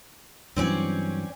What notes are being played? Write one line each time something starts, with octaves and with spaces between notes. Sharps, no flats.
G2 E3 F#3 C4 C#4 D5